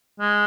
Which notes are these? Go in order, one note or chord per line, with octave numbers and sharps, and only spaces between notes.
G#3